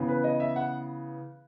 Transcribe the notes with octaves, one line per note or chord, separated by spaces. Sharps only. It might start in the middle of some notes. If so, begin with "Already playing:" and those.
Already playing: C#3 E3 B3
B4
D#5
E5
F#5